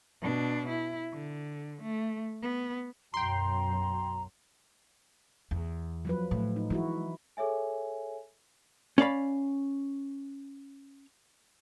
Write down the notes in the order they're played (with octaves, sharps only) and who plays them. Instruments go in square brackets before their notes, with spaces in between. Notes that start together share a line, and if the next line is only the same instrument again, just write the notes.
[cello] B2 D4
E4
D3
A3
B3
[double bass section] B1 F#2 F#3 [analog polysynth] G5 C6 [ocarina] A#5
[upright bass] E2
[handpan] F3 F#3 B4
[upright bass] A2
[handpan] D#4
[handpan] E3 E4 F#4 [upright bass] G#3
[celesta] G#4 A4 C#5 E5 G#5
[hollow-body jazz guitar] C#4 D5 F5 B5